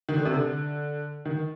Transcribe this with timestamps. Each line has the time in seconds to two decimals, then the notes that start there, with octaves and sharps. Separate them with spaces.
0.09 D#3
0.16 D3
0.25 C3
0.34 D3
1.25 D#3